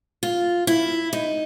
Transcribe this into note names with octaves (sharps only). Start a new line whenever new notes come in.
F4
E4
D#4